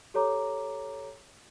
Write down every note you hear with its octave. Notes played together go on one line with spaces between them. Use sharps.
G4 A4 C#5 A#5 D6